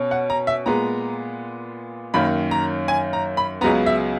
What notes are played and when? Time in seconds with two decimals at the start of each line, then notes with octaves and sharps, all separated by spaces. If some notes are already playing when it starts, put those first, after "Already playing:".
Already playing: B2 C#4
0.11 F#5
0.30 A#5
0.47 E5
0.66 A#2 G#3 B3 A#5
2.14 F#2 D#3 A#3 C#4 B5
2.51 A#5
2.88 G#5
3.13 A#5
3.37 B5
3.61 C#2 C#3 F#3 B3 A#5
3.86 E5